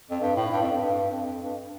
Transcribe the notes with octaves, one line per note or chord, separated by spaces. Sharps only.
F2
G2
A2
G2
F2
G2
G2
F2
G2